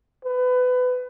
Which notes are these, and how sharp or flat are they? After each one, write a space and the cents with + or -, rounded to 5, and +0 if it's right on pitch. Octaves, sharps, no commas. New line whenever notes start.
B4 +25